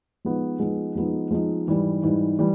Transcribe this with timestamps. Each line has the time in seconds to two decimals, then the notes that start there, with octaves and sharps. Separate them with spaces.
0.25 F3 G#3 B3 D#4
0.59 F3 G#3 B3 D#4
0.96 F3 G#3 B3 D#4
1.31 F3 G#3 B3 D#4
1.67 G#2 E3 G3
2.03 G#2 E3 G3
2.39 E3 G3